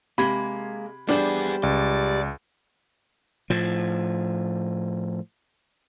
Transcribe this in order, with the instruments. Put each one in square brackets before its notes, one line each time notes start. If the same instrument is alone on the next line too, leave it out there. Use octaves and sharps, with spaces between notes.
[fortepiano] C3 [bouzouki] G#3 A#3 [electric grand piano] B5 G#6
[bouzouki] G3 C5 [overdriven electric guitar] B3 G#4 [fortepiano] D4
[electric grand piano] C#2 [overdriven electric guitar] D5
[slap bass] A2 F3